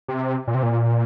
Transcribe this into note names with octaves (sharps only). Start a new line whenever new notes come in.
C3
A#2
C3
A#2